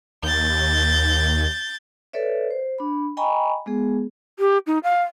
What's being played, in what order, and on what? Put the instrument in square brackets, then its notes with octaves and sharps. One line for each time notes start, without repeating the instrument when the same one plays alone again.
[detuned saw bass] D#2 [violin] G6 A6
[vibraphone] A4 B4 C#5 D5 E5
C5
D4 B5
D#5 G5 G#5 A#5 B5 C#6
G#3 B3 G#4
[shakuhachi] G4
D#4
F5